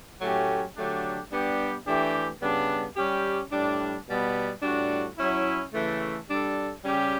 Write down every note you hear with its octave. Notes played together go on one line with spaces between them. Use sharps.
A2 F#3 A3 C#4 G4
D3 F#3 A3 D4 G4
G3 B3 D4 G4
E3 A3 D4 G4
C#3 G3 B3 D4
G3 C#4 G4
A2 G3 D4
B2 G3 B3
A2 G3 D4 F#4
F#3 C#4 E4
C#3 E3 A3
G3 D4 A4
C#3 G3 C#4 G4